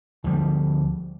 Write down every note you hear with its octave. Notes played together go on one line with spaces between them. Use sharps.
D2 F3 G3